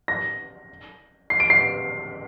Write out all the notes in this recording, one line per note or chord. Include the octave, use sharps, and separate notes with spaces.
A#6
C7
D7
C7